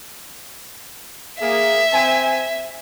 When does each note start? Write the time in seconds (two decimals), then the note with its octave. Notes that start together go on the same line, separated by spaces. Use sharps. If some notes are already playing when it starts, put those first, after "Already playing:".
1.41 A#3 G#4 E5
1.93 C4 G#5